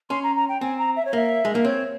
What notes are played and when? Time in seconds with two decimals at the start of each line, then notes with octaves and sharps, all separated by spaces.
0.10 C#4 C6
0.23 A#5
0.36 A#5
0.49 G5
0.61 C4 G#5
0.78 A#5
0.96 E5
1.05 C#5
1.13 A#3 E5
1.45 G#3
1.55 A#3
1.64 C4 C#5